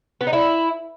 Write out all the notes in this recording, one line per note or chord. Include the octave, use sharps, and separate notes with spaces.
B3
D#4
E4